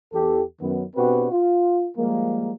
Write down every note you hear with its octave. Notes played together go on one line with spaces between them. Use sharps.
E2 G4 A4
F#2 D#3 B3
B2 C4 D4 F#4 G4 B4
F4
F3 G3 G#3 A#3